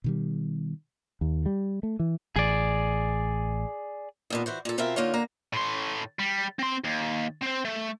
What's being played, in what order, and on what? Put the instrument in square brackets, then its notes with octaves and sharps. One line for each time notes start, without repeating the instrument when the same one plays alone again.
[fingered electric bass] B2 D#3 G3
[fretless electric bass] D#2
G3
A3
E3
[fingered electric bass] A1 [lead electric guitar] G#4 D5
[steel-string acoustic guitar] D#2 A#2 B3
E3 F#4 C5
A#2 A4
B2 C4 F4 A#4 E5
D3 A#3 D#4 F4 C#5
D3 A#3 A#5
[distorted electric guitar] A2 C6
G3
C4 C6
D#2
C4 C5
A3